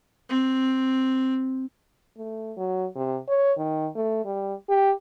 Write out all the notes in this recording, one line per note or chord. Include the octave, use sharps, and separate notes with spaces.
C4
A3
F#3
C3
C#5
D#3
A3
G3
G4